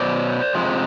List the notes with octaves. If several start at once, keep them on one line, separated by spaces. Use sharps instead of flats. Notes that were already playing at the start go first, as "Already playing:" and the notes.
Already playing: B2 F#3 C5 D5
F2 C3 F3 G#3